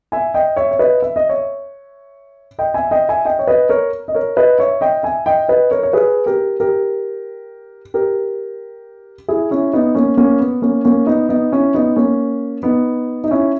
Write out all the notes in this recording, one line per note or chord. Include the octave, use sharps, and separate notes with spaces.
E5 G#5
D#5 G5
C#5 E5
C#5
B4 D#5
E5
D#5
C#5 E5
D#5 G5
E5 G#5
D#5 G5
E5 G#5
D#5 G5
C#5
B4 D#5
A#4 C#5
D#5
A#4 C#5
B4 D#5
C#5 E5
D#5 G5
E5 G#5
D#5 G5
B4 D#5
A#4 C#5
C#5
G#4 B4
G4 A#4
G4 A#4
G4 A#4
E4 G#4
C#4 E4
B3 D#4
A#3 C#4
A#3 C#4
B3
A#3 C#4
A#3 C#4
B3 D#4
B3 D#4
C#4 E4
B3 D#4
A#3 C#4
B3 D#4
D#4
C#4 E4